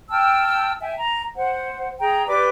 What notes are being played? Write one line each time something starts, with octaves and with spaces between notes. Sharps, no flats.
G5 A5 E6 F6
E5 G5 G#5
A#5
C5 F#5
G#4 G5 A#5
G4 B4 D5 D6